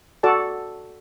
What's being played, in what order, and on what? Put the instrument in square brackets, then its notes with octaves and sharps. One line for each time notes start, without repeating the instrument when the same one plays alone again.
[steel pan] F#4 A4 D5 A5